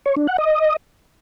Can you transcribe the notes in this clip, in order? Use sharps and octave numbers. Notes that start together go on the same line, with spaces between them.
C#5
D4
F#5
D#5